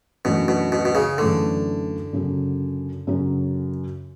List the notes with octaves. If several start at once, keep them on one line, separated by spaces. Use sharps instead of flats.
F#2 B2 E3 A3 D4
B2
B2
B2
C#3
F#2 D3 E3 A3 D4
F#2 C#3 F#3
F#2 C#3 F#3